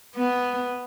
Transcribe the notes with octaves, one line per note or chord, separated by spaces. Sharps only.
B3